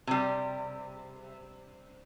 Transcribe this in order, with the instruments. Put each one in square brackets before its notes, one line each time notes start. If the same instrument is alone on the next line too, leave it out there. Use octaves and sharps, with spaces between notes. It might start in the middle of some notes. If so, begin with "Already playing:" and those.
[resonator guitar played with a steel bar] C3 G3